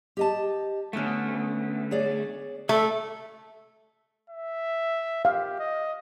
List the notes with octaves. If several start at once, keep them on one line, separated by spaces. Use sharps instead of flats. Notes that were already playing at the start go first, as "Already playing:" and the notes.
G4 D#5 A5
D3 A3 B3 C#4
G#4 C#5 D5
A3 A4
E5
G4 F5
D#5